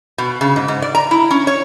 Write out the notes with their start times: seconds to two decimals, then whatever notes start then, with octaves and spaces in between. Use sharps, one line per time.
0.18 B2
0.41 C#3
0.56 G#2
0.68 G#2
0.82 D5
0.95 A#5
1.11 E4
1.31 C#4
1.47 C#5